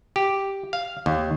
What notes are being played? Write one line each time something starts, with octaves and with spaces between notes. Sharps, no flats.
G4
F5
D#2